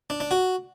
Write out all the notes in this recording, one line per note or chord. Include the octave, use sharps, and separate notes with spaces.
D4
D4
F#4